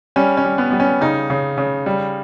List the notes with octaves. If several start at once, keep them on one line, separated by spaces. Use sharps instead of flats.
G3 C#4
C#4
G3
B3
G3 B3
C#4
C#3 D#4
C#3
C#3
G3